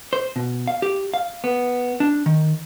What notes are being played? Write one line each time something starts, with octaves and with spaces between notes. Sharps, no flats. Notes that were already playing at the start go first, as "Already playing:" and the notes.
C5
B2
F5
G4
F5
B3
D4
D#3